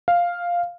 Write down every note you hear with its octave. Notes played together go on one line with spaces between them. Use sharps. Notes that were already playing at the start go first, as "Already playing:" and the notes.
F5